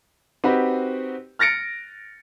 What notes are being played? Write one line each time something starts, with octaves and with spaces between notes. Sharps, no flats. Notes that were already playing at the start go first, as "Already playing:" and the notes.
C4 D#4 F#4 G4 B4
F6 A6 A#6 C#7 D7